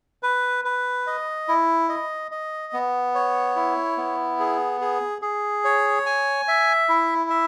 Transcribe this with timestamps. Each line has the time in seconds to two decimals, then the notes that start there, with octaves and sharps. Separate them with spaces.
0.23 B4
0.65 B4
1.07 D#5
1.48 E4
1.89 D#5
2.31 D#5
2.73 B3
3.15 C#5
3.56 E4
3.97 B3
4.40 G#4
4.81 G#4
5.22 G#4
5.65 C#5
6.06 G#5
6.48 E5
6.89 E4
7.30 E5